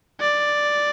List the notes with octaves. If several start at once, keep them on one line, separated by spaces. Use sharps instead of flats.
D5